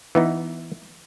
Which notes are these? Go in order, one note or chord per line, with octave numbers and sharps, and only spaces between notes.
E3 B3 D#4